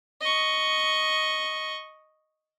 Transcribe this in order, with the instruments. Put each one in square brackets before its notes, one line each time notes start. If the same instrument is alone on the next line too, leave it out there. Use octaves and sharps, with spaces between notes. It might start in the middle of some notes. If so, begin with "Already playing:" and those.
[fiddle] D#5 C#6